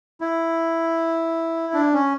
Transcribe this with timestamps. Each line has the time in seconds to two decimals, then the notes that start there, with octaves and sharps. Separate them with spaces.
0.21 E4
1.74 D4
1.93 C#4